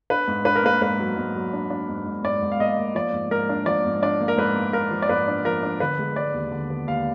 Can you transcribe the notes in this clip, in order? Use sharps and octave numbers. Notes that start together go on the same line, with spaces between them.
D4 B4
G#2
D4 B4
A#4
A#3 B4
G#2 B4
F#3
G#2
F#3
D4
D4
G#2
G#2
G#2 D5
G#2
F5
A#3 D#5
A#3
F3 D5
G#2
G#2 A#4
D4
F3 D5
G#2
D4 D5
A#3
A#4
G#2 B4
A#3
A#3 A#4
F3
D5
G#2 B4
D4
F3 A#4
D4
D3 B4
G#3
G#3 D5
D#2
D3
B3
D#2 F5